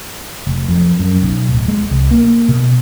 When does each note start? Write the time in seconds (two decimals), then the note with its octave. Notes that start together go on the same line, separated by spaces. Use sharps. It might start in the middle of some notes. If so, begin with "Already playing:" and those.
0.47 F1
0.68 F2
0.99 F#2
1.23 B1
1.49 D1
1.68 G#3
1.91 C2
2.11 A#3
2.48 B2